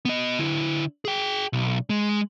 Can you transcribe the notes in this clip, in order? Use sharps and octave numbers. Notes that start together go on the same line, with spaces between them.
B3 D#5
D3 E4
G#4 G5
B1
G#3